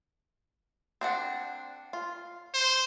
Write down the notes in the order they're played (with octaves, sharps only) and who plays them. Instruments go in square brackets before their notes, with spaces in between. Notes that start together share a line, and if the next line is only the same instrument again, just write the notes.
[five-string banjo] C4 D4 F#5
F4
[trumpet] C5